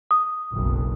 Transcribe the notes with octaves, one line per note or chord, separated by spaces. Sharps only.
D#6
F#1 B1